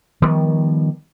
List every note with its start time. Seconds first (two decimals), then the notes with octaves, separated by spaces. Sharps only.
0.22 D#3 F3 G3 B3